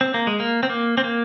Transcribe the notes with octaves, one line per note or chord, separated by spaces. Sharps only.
C4
A#3
G#3
A#3
C4
A#3
C4
A#3